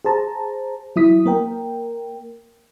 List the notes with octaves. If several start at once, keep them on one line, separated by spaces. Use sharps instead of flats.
G#4 C5 A5 A#5
F#3 E4 D#6 B6
A#3 A#4 G5